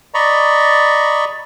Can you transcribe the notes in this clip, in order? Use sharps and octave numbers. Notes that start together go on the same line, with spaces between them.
D5 D#5 A#5 B5 C#6